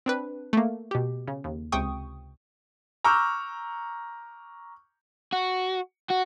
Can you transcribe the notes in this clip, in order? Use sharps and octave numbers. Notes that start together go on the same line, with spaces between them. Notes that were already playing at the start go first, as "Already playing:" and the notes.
C4 D4 B4
A3 A#3
B2 G4
C#3
D#2
C#2 C3 G5 C#6 D#6
A#5 C#6 D6 E6 F6 G6
F#4
F#4